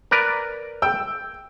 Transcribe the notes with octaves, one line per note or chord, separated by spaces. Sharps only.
A#4 B4 D5
G5 E6